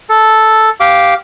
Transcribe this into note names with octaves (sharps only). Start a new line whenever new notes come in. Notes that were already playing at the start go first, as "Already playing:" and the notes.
A4
G4 F5 D6